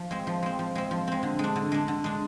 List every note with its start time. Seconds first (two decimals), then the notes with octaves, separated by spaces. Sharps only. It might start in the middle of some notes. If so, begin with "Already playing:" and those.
Already playing: F3
0.11 G#3 C4
0.27 F3
0.43 G#3 C4
0.59 F3
0.75 G#3 C4
0.91 F3
1.07 G#3 C4
1.23 D3
1.39 G#3 D4
1.56 D3
1.72 G#3 D4
1.88 D3
2.04 G#3 D4